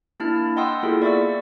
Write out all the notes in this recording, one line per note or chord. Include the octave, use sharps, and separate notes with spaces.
A#3 D4 E4 A5 F6
D#5 F#5 G5 C6 D#6 E6
A#3 B3 E4 F4 G#4 A4
D5 E5 C#6 E6